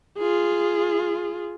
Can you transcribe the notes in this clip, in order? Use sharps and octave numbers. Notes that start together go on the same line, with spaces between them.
F4 G#4